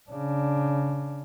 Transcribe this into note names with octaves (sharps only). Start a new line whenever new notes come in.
C#3 D4